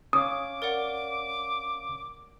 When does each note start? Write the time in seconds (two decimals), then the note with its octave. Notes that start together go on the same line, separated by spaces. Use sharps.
0.13 C#4 C#5 F5 D6 D#6
0.62 A#4 D5 F#5